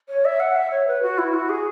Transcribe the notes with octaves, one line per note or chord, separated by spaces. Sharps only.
C#5
E5
F#5
E5
C#5
B4
F#4
E4
F#4
G#4